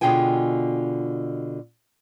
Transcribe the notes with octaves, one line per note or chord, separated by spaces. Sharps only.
B2 D3 F4 G#4 G5 G#5